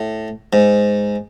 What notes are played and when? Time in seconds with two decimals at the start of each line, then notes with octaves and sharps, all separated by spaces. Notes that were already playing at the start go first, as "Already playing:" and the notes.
Already playing: A2
0.53 G#2